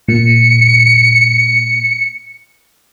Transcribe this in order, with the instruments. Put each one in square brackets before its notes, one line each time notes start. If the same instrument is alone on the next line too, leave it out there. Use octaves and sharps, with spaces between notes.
[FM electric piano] A#2 [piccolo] C#7